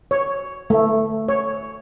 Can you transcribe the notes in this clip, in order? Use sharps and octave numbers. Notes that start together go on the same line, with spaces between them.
C#5
A3
C#5